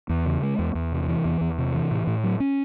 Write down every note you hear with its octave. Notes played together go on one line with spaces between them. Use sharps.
E2
C#3
G#3
E2
E2
C3
E3
E2
E2
C3
E3
A2
A2
F#3
C#4